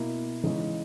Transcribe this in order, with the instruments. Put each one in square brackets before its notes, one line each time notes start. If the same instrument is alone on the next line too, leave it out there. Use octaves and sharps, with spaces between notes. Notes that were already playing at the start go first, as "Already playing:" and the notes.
Already playing: [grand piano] B2 A#3 E4
C#3 E3 G#3 D#4